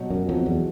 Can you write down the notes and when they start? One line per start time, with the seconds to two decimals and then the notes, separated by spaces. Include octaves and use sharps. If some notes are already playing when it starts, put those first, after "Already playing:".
Already playing: B2 F#3
0.10 F#2 B2
0.28 F2 F#3
0.46 E2 F#3